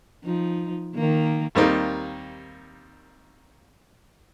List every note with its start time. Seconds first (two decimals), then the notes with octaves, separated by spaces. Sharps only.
0.24 F3 D#4
0.95 D#3 A#3
1.55 D#2 G3 A#3 C4 D#4